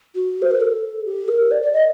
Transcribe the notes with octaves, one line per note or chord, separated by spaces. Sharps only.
F#4
C5
A#4
A4
G4
A#4
D5
D5
D#5